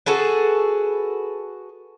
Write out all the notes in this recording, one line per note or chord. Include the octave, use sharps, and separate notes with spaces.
F#4 G#4 A4 B4